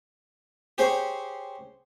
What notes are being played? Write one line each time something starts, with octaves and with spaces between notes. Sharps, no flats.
G4 G#4 C5 C#5